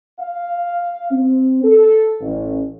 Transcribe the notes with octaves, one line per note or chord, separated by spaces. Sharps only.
F5
C4
A4
A1